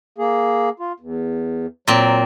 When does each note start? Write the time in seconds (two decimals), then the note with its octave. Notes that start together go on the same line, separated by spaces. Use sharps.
0.18 A#3 G#4
0.80 F4
1.00 E2
1.88 A#2 F#3 C4